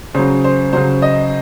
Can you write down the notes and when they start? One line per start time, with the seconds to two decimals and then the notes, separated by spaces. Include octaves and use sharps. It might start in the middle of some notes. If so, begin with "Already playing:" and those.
0.14 C#3 F#3 C5
0.44 C5
0.73 C#3 F#3 C5
1.02 D#5